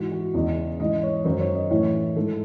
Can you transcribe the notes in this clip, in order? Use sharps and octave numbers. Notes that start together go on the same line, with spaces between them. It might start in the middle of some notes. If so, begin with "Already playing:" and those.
Already playing: G#2 E3 F#4
F#4
E2 C#3 E3 D#5
G#2 E3 D#5
C#5
F#2 D#3 C5
C#5
D#5
A2 E3 C#5
G#2 E3 A4